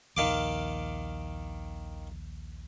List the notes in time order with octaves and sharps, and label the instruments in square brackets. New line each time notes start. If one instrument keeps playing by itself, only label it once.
[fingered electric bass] A#1 D#2 [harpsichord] D#3 F5 D6